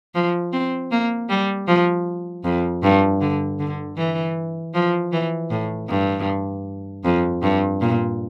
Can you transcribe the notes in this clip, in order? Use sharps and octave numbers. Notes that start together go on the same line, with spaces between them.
F3
C4
A#3
G3
F3
F2
G2
D3
D3
E3
F3
E3
A2
G2
F2
G2
A#2